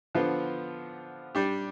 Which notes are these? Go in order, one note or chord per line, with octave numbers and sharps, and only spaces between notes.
D3 F3 B3 F4
G3 D4 G4